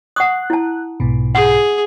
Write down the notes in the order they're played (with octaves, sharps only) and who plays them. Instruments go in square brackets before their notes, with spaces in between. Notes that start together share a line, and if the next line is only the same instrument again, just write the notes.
[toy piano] F#5 C#6 D#6 [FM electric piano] F#6
[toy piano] E4 A5
[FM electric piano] B1 G#2 B2
[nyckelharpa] G#4 [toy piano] F#5